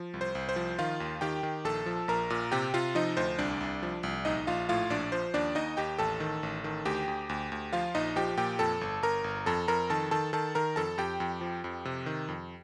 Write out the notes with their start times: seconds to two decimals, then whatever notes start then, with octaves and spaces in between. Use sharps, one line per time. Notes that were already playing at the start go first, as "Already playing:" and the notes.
Already playing: F3
0.14 C2
0.21 C5
0.35 C2
0.49 C5
0.56 F3
0.79 D#3 F4 F5
1.00 D#2
1.21 D#3 G4 G5
1.43 D#3
1.64 A#1 A4 A5
1.86 F3
2.08 A#1 A#4 A#5
2.30 A#2
2.52 C3 G4 G5
2.74 C3 F4 F5
2.95 F3 D#4 D#5
3.17 D2 C5
3.39 C2 D4 D5
3.61 C2
3.83 F3
4.03 C2
4.25 A#1 D#4 D#5
4.47 A#1 F4 F5
4.69 A2 F4 F5
4.90 A#1 D4 D5
5.12 F3 C5
5.34 D#2 D4 D5
5.55 D#2 D#4 D#5
5.77 D#2 G4 G5
5.99 A1 A4 A5
6.20 D#3
6.43 A1
6.64 D#3
6.85 D2 G4 G5
7.08 D2
7.29 D2
7.52 D2
7.73 F3 F4 F5
7.95 A#1 D#4 D#5
8.16 F3 G4 G5
8.37 A#2 G4 G5
8.59 F2 A4 A5
8.81 G1
9.02 G1 A#4 A#5
9.24 G1
9.46 F2 A4 A5
9.68 F2 A#4 A#5
9.90 D#3 A4 A5
10.11 D#3 A4 A5
10.33 D#3 A4 A5
10.55 D#3 A#4 A#5
10.76 F2 A4 A5
10.98 F2 G4 G5
11.20 F2
11.41 F3
11.64 F2
11.85 C3
12.06 D#3
12.28 F2